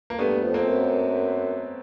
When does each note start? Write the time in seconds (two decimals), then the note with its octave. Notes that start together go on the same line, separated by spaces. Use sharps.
0.10 A#3
0.18 G2 A3 B3
0.43 F2
0.54 A#3 C4
0.66 F#2